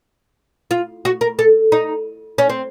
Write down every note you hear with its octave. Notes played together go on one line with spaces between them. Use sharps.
F4
F#4
A#4
A4
D#4
C#4
C4